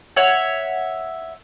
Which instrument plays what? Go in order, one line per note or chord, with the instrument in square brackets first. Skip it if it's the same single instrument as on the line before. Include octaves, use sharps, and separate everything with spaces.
[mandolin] C#5 E5 F#5